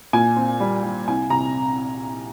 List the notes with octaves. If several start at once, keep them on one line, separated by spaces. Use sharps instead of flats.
A#2 G#5
C4
G3
G3
C2 G#5
C3 A#5